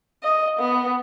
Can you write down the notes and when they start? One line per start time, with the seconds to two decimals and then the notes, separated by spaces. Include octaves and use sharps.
0.23 D#5
0.59 B3